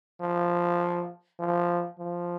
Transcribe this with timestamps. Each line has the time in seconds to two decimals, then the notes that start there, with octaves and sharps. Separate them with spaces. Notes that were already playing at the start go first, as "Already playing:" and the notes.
0.21 F3
1.39 F3
1.99 F3